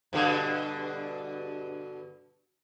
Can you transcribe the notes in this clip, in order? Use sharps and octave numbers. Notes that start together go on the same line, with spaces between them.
G2 B2 D3